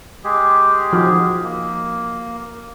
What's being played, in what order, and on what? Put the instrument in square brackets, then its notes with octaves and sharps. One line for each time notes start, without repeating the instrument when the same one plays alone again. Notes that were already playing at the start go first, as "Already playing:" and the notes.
[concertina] G#3 G4 G#4
[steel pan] F3 D#4 F#4
[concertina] A#3